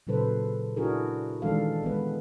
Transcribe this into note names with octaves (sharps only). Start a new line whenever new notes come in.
A#2 C#3 F#3 A4 B4 C5
D4 E4 F#4 G#4 A#4
D#3 E3 G#3 D4 A4 F5
G#3 B3 B4